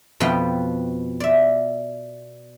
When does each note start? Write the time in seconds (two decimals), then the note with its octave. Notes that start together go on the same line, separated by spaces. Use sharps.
0.20 F2 B2 F3 B3 B4 G5
1.20 D5 E5